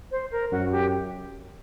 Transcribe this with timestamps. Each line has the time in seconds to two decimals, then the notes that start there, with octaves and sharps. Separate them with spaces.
0.11 C5
0.32 A#4
0.51 F#2 F#4
0.72 G4